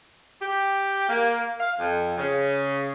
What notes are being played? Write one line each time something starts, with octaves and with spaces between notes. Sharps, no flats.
G4
A#3
F5
F2
C#3